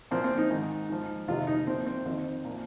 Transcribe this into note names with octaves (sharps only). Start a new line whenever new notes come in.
A#2 F3 C4
C4
D#4
G#2 D#3
G#2 F3
F2 C3 D#3 F4
D#4
A#2 F3 C4
C4
F2 D#3 C4
A#2 F3